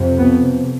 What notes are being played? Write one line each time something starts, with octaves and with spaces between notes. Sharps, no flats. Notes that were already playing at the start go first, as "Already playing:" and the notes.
Already playing: F2 C3
B3